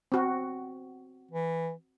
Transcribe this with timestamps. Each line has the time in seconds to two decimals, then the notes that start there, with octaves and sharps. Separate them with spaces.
0.12 C4 F#4
1.31 E3